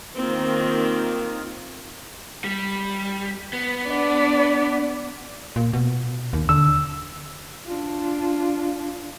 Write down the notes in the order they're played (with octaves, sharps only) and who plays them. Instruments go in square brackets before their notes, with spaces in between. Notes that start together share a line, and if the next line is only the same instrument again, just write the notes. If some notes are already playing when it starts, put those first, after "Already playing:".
[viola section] D#3 F4 [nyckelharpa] A#3 C4
[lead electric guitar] G3
B3
[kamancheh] D4 D5
[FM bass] A#2
B2
D#2
[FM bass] D3 [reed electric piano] E6
[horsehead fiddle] D4 F4